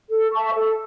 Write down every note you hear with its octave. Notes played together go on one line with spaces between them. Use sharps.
A4
E5 A5 C#6
A4